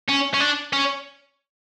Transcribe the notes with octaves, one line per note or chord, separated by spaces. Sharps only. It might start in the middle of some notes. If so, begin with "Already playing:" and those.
C#4
C#4
D4
C#4